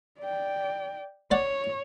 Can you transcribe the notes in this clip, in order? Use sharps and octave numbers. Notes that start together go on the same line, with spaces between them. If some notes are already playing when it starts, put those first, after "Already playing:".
D5 G5
C#5 D5 F#5